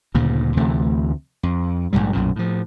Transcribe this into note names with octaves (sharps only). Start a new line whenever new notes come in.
D2 G2 A#2 C#3
D2 C3 E3 A3
F2
A#1 D#2 G#2 G3
B1 F#2 A#2
A2 F3